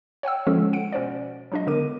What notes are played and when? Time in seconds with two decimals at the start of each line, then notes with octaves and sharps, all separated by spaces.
0.23 C#5 F#5 G5 E6
0.47 D3 F3 G#3 C#4 F4 A4
0.73 F#5 D7
0.93 B2 C#4 C5 D5
1.52 F#3 G#3 D4 F4 D#5
1.67 D3 B3 A#4 D6 D#7